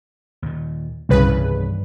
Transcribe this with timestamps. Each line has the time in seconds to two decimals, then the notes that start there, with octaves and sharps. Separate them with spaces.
0.42 D#2 A#2
1.09 D1 C2 G2 C#3 B4
1.29 G2 D#3 E3